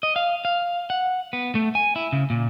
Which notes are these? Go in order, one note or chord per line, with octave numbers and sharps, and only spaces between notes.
D#5
F5
F5
F#5
B3
A3
G#5
E4
C#3
A#2